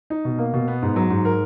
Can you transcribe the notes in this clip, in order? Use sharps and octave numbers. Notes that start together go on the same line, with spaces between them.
D#4
B2
A#3
B2
B3
G#2
F#3
G#2
A#4